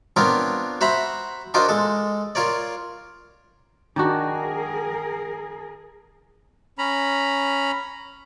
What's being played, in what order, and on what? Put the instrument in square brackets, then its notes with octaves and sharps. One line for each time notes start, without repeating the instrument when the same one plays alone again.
[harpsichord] B3 C4 D4 F4 A#4 C#5
F#4 C5 E5 A#5 B5
D4 F4 F#4 A#4 C5 D#5
G#3 A4
F4 A#4 C#5 D5
[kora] D#3 D4 F#4 [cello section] G#4 A#4
[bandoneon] C#4 A#5 B5